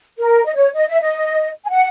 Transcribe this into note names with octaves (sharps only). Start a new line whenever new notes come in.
A#4
D#5
C#5
D#5
E5
D#5
G#5
F#5